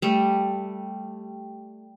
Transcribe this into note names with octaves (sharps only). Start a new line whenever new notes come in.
G3 A3